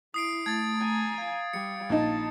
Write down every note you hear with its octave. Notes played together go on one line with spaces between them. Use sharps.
E4 D#6 C7 D7
A3 G#6 A6
G#5 A#5
F5
G3 C#7
A#1 D#4 A5